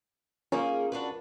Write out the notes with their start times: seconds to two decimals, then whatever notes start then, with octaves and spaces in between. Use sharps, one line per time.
0.52 A#3 C#4 D#4 F4 G#4 A#4
0.92 D4 F#4 B4